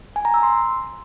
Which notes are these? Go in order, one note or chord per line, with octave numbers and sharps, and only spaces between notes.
G#5
A#5
E6
C6